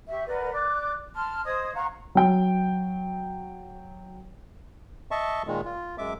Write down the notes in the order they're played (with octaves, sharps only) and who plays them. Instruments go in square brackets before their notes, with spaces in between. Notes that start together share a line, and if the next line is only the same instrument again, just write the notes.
[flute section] G4 E5 C#6
A#4 B4 D5 F#5
D5 D6 F#6
A5 C6 F6
C5 D#5 D#6 G#6
F5 F#5 A#5 C#6
[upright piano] F#3 G5
[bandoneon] D#5 E5 A5 C#6
A#2 D#3 G#3
F4
F#2 G#3 E5 D6